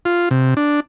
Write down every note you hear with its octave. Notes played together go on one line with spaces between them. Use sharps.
F4
C3
D4